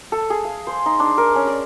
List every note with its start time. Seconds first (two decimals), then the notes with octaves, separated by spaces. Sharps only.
0.12 A4
0.30 G#4
0.45 F5
0.67 C5
0.86 D#4
1.00 D4
1.18 A#4
1.35 C#4
1.47 D5